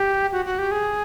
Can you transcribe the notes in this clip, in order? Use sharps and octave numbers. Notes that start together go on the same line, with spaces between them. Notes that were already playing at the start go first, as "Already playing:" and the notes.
Already playing: G4
F#4
F#4
G4
G#4